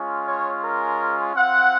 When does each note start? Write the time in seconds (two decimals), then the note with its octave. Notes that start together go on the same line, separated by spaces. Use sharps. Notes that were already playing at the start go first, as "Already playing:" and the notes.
Already playing: G#3 C#4 F4
0.27 C#5
0.64 A#4
1.36 C4 F4 F#5